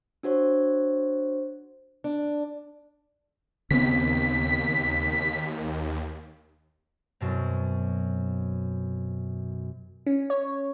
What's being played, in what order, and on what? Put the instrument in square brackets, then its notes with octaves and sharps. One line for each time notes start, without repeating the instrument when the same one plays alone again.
[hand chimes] D4 F#4 C5 C#5
[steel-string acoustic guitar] D4
[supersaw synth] D#2 [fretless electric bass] C#3 B3 C4 [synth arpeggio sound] B6
[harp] F#2 B2 C4
[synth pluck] C#4
C#5